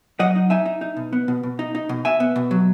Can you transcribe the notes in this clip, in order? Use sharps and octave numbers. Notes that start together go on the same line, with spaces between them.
F#3 D#5 F#5
D#4
D#4 E5 G#5
D#4
D#4
B2
B3
B2
B2
D#4
D#4
B2
B2 E5 G#5
B3
B2
F#3